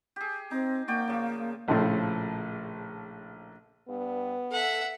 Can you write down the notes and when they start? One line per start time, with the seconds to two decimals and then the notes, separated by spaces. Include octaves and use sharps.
0.16 G4 G#4
0.51 C4 D#4
0.88 A#3 F#4 D5 G5
1.07 C#3 F3
1.68 A#1 A2 C#3 F3 A3
3.89 G2 B3
4.52 A4 E5 F#5